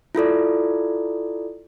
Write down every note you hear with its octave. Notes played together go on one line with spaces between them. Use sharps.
E4 F4 A4 D5